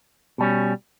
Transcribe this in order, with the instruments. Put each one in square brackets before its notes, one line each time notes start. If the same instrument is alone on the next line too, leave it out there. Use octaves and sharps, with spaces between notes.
[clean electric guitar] B2 G3 C#4